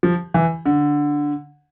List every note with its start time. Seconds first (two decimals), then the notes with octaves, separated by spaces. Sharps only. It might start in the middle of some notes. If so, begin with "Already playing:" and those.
0.03 F3
0.34 E3
0.66 D3